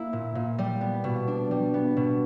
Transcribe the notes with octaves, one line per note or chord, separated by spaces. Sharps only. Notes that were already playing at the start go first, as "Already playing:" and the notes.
Already playing: A#3 E4
A#2
A#2
G3
B3
B2
D4
G3
B3
B2